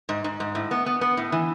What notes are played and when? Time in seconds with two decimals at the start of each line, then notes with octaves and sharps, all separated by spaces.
0.09 G#2
0.24 G#2
0.40 G#2
0.55 A2
0.71 B3
0.86 B3
1.01 B3
1.17 A2
1.32 E3